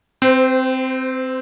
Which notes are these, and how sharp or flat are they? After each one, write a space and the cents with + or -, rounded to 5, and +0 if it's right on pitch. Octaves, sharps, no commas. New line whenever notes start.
C4 -5 C5 -30